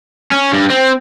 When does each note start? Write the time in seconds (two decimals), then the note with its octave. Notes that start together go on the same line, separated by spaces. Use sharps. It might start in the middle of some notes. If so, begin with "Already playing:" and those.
0.32 C#4
0.53 G2
0.70 C4